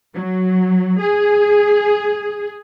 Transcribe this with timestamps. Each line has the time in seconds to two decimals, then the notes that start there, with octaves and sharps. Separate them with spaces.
0.15 F#3
1.00 G#4